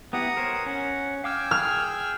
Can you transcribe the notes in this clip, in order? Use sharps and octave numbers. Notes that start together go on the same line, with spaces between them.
B3 E4 G4 F#5 A#5 D#6
A#4 C5 C#5
C#4 F#5
F5 G5 G#5 D6 E6 F6
G#4 F6